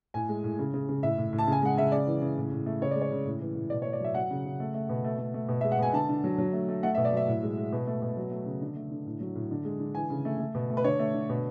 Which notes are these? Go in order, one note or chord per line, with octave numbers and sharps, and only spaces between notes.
A2 G#5
G#3
A2
C#3
C#3
C#3
A2 E5
A2
A2
A5
C#3
G#5
G#3 F#5
C#3 E5
C#3 D5
E3
C#3
A2
A2
A3
C#3 C#5
G#3 D5
C#5
C#3
A2
E3
A2
B2 D5
C#5
A3
D5
F#3 E5
F#3 F#5
C#3
C#3
A3
A3
B2
A3
A3
A3
B2
G#3 E5
F#5
B2 G#5
D3 A5
D3
F#3
F#3
A3
A3
A3 F#5
E5
B2
D5
F#3 E5
A2
G#3
G#3
B2
A3
B2
F#3
A3
C#3
D3
A3
D3
A2
F#3
A2
D3
G#3
D3
E3 G#5
C#3
A3
A3
B2
A3
B4
D3 C#5
A3
D3
B2